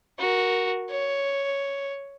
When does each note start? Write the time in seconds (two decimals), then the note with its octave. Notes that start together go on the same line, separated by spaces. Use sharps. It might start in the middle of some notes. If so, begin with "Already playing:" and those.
0.19 F#4 A#4
0.90 C#5